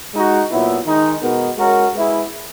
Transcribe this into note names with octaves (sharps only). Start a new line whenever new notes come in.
G#3 D#4 F#4
A#2 F#3 B3 E4
D#3 G#3 D#4
B2 G#3 B3 F#4 A#4
G#3 C#4 F#4 A#4
G#3 B3 E4 G#4